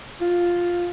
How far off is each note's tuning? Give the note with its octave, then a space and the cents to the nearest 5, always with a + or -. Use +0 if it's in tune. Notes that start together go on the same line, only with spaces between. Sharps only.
F4 +5